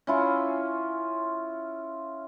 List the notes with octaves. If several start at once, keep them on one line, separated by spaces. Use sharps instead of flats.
C#4 E4 F4